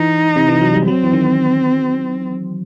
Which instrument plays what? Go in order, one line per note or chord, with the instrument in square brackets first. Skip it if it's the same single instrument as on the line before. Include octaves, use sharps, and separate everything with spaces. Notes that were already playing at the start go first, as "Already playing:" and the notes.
Already playing: [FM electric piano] E3 [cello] D#4
[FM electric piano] C3
E3
F#3
G3
[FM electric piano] F#3 [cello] C4
[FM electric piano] E3
D#3